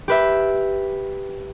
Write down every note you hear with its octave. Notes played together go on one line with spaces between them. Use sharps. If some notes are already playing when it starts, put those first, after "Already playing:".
G4 B4 E5